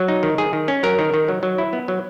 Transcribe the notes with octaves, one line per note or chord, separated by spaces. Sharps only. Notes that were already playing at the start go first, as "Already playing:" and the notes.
Already playing: F#3
D#4
D#3
D#3 G#4
D#3
C#4
F#3 A#4
D#3
D#3
F#3
F#3
E4
B3
F#3